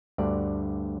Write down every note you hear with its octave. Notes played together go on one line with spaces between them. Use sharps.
D2 G2 D3 D5